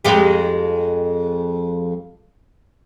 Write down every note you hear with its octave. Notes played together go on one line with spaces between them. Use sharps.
F2 G#3 G4